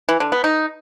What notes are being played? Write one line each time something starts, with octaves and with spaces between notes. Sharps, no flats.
E3
D3
B3
D#4